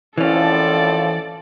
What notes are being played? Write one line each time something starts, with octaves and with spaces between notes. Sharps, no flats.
G#1 A2 E3 F3 C#4 A4 D5